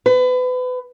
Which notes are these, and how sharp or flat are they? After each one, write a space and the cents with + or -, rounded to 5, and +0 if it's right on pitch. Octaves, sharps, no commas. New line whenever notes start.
B4 +30